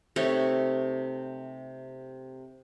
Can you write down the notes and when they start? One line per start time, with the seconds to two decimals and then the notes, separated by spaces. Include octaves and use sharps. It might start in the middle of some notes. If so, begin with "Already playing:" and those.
0.16 C3 A3 D#4 C#5